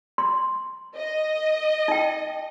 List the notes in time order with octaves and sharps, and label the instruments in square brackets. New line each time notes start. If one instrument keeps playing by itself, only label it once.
[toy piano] C6
[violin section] D#5
[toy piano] D#4 G5